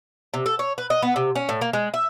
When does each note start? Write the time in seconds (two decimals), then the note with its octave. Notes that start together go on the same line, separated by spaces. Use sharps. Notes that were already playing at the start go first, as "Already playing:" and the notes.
0.34 C3
0.46 A4
0.59 C#5
0.78 B4
0.90 D#5
1.02 B3
1.16 C3
1.36 C#4
1.49 A2
1.61 A#3
1.73 G#3
1.94 E5